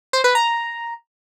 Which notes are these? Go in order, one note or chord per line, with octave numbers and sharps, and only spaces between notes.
C5
B4
A#5